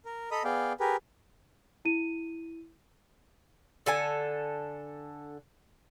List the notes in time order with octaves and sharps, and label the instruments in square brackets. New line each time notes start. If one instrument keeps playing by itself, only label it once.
[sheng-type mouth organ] A#4
A4 D#5 A#5 B5 D#6
B3 G#4 D5 F5 G5
G4 G#4 A#4 B4
[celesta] E4 D#7
[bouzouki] D3 A4 G#5